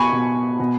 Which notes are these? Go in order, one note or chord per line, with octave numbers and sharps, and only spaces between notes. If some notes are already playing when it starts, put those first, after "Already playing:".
Already playing: B2 G#5 B5 C#6
B2
B2